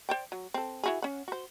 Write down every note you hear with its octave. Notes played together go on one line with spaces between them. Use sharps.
C5 D5 G5
F#3
C4 A4
E4 F#4 G#4
C#4 F#5
F#4 C5